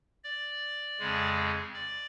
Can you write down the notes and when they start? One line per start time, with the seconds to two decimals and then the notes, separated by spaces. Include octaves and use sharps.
0.24 D5
0.99 F2 C#3 G#3
1.74 D5